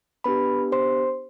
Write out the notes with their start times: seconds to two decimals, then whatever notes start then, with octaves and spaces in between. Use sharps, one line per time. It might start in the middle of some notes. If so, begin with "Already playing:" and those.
0.24 B3 D4 G4 B4 B5
0.72 C5 C6